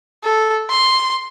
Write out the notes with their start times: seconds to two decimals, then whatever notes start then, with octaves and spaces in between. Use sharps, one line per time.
0.24 A4
0.70 C6